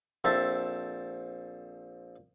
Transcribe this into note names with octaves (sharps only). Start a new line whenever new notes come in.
A#1 C4 A4 E5 A5